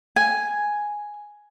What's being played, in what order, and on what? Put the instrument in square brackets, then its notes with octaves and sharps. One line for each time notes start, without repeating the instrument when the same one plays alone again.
[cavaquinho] G#5